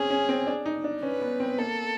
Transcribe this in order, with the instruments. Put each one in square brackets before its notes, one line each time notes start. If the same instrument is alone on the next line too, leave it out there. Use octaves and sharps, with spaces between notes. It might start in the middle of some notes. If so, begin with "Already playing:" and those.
Already playing: [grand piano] C4 C#4 [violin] G#4
[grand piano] C#4
C4
D4
D#4
D4
[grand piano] C#4 [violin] B4
[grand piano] B3
C4
[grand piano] A#3 [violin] A4